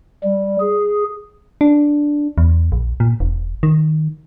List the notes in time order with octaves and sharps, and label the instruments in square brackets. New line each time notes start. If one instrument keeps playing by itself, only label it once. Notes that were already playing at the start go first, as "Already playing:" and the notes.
[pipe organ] G3
G#4
[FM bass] D4
E2
A#1
A#2
E1
D#3